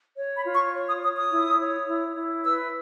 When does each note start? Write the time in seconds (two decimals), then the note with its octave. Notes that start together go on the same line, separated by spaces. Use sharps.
0.16 C#5
0.35 B5
0.44 F4
0.54 C#6
0.72 C#5
0.86 D#6
1.01 C#5 D#6
1.16 D#6
1.30 E4
1.58 C#5
1.86 E4
2.15 E4
2.44 B4 E6